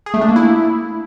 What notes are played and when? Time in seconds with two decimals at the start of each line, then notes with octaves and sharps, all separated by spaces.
0.06 G#4
0.14 A3
0.21 D4
0.29 A#3
0.36 E4